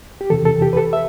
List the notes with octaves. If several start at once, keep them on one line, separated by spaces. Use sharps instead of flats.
G4
E2 C3 E3 A4
A4
G4
B4
A4
E5